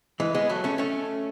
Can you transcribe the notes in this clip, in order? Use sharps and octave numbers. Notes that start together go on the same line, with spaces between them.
E3 G#3
G#3 B3
F#3 A3
A3 C#4
A3 C#4